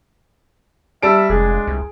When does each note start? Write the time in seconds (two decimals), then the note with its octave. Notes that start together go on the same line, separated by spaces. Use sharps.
1.03 G3 E5 A5 D7
1.30 F1 G#3 D4 G#4
1.67 C2